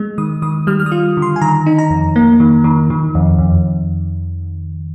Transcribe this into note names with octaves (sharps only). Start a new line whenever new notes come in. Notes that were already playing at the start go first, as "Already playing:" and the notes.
Already playing: G#3
D#3 D#6
D#3 D#6
G3 F6
F6
D#6
F4
D3
C6
G#5
D#3 A#5
D#4
A#5
F2
A#3
D#3
D#3
D#3
F2
F2